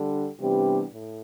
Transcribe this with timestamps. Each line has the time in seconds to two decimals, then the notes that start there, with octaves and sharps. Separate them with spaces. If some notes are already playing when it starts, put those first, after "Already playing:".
Already playing: D3 G3 D4
0.38 C3 E3 G3 B3 D4 G4
0.93 A2